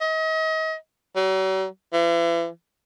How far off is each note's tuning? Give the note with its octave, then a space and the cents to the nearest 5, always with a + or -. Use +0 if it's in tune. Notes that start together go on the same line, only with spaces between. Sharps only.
D#5 +35
F#3 +45
E3 +40